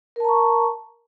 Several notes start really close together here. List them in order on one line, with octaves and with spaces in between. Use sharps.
A#4 A5 A#5 C#6